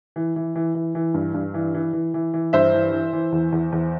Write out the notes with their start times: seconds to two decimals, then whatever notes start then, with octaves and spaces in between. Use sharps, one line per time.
0.16 E3
0.36 E3
0.55 E3
0.75 E3
0.95 E3
1.14 G2
1.34 G2
1.54 E3
1.75 E3
1.93 E3
2.14 E3
2.34 E3
2.53 G2 C5 E5
2.73 E3
2.92 E3
3.13 E3
3.32 E2
3.52 E2
3.72 E2